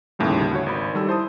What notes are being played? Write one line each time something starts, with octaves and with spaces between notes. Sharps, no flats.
G1 D#2 A2 C#3 G3
D2 F#4 C#5
G#1 B5
D#3 G3 A4 E6
E4 C5 A5 D#6